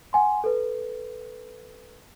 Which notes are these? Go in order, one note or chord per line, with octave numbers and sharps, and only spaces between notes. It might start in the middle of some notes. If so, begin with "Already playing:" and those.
F#5 G#5 C6
A4 B4